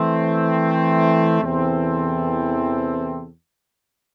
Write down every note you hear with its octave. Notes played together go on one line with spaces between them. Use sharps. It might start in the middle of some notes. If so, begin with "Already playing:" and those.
Already playing: E3 A3 C4
E2 C3 E3 C4 A4